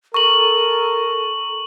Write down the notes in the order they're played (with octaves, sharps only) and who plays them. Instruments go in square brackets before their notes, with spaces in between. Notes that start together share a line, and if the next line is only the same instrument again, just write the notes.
[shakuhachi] A4 [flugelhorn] A#4 [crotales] C#6 F#7